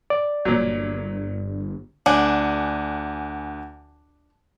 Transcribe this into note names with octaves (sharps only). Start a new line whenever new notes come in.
D5
G1 A#2 F#3
D2 D4 F#5 G#5